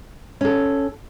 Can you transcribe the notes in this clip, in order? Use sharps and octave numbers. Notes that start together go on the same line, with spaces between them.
C#4 A4